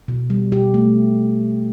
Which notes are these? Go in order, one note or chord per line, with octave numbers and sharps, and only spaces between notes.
B2
G3
B2 G4
A3